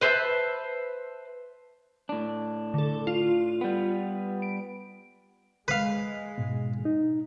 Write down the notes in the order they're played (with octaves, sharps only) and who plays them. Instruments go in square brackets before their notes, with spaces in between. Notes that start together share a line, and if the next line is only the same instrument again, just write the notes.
[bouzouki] B4 C5 E5 A5
[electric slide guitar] A2 D4
[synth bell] D3 A4
F4
[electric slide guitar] G3 B3
[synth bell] D7
[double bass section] G#3 [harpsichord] B4 F5
[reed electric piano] G#2 B2
D#4